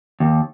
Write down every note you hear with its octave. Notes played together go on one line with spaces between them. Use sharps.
D#2